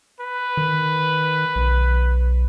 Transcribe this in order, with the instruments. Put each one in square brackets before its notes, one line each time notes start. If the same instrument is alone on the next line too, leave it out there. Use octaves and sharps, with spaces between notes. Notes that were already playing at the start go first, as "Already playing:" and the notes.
[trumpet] B4
[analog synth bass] D#3
B1